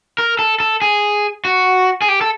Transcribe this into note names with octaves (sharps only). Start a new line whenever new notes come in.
A#4
A4
A4
G#4
F#4
G#4
G4
A4